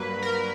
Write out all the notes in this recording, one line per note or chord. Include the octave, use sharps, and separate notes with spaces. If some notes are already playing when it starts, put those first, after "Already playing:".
Already playing: G2 F#3 A#3 B4
A#4